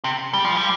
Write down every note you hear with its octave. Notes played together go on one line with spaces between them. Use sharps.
C3
G3
F3
G3